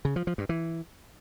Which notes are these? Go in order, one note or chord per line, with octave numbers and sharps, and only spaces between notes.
C#3
F3
F3
G2
E3